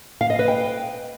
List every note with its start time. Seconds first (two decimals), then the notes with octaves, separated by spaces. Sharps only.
0.21 F5
0.30 D#5
0.39 B4
0.48 G5